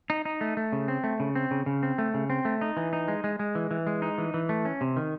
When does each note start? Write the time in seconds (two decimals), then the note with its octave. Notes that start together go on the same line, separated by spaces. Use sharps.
0.10 D#4
0.25 D#4
0.41 A3
0.57 A3
0.73 C#3
0.88 C4
1.04 A3
1.20 C#3
1.35 C4
1.51 C#3
1.66 C#3
1.83 C4
1.98 A3
2.14 C#3
2.30 C4
2.45 A3
2.61 D#4
2.77 E3
2.93 D#4
3.08 G#3
3.24 G#3
3.39 G#3
3.55 E3
3.71 E3
3.87 G#3
4.02 D#4
4.18 E3
4.34 E3
4.49 A3
4.65 C#4
4.81 C3
4.97 D#3